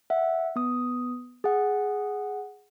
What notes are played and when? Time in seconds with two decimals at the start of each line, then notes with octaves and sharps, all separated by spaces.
0.10 E5 F#5
0.56 B3 D#6
1.44 G#4 F#5